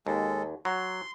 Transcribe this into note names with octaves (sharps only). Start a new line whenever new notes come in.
D#2 G#3 A4
F#3 C6